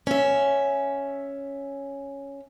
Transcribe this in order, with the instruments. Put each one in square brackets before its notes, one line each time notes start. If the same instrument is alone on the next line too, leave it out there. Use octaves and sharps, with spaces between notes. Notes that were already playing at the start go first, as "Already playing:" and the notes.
[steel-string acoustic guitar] C#4 E5